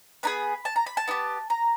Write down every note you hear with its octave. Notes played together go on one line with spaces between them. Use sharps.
B3 D#4 G#4 B5
A5
A#5
B5
A5
B3 E4 G4
A#5